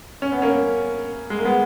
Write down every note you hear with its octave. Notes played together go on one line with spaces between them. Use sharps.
C#4
B3
A#3 C#4
G#3
A#3
G#3 B3